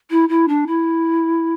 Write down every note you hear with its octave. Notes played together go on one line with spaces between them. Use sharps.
E4
E4
D4
E4